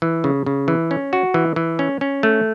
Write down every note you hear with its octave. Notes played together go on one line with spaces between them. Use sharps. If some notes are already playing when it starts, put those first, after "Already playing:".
E3
C#3
C#3
E3
C#4
F#4
E3
E3
C#4
C#4
A3